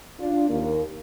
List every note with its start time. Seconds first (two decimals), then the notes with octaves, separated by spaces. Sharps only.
0.20 D4 F4
0.49 D#2 A#3